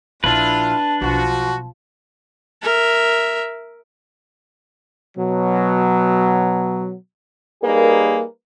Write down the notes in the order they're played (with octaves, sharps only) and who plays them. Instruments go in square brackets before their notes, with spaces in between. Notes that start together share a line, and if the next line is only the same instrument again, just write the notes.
[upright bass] A#1 [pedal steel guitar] D4 B4 [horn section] E4 F4 [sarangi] A5
[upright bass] B1 [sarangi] F3 [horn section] F#4
[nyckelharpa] A#4 E5
[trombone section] B2 F#3
[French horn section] G3 A#3 D#4 G#4 A#4 B4